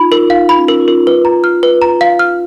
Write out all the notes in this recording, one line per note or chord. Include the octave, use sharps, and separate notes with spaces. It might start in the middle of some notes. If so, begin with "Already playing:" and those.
Already playing: D#4 F4 B5
F4 A#4
D#4 F5
B5
C#4
A#4
F4
A#4
F4 B4
A#5
F6
B4
A#5
F5
F6